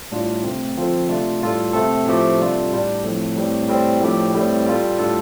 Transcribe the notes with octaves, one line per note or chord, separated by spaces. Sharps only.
A2 G3 D4 F4
C3 A3 C4
D3 F3 C4 F4 A4
C3 A3 D4 F4
A2 G3 F4 A4
C3 A3 C4 A4
A2 F3 A3 C4 G4
C3 G3 D4 F4 A4
A2 G3 D4
A2 F3 C4 A4
A2 G3 C4
A2 G3 C4
A2 F3 D4 G4
A2 G3 C4
G3 F4 A4
A2 G3 D4 F4 A4